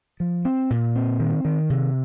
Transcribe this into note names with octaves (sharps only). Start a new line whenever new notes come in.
F3
C4
A#2
C4
D#3
D#3
C3